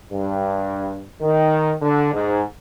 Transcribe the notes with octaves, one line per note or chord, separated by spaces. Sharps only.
G2
D#3
D3
G#2